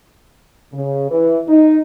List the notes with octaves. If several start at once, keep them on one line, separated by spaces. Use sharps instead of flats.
C#3
E3
D#4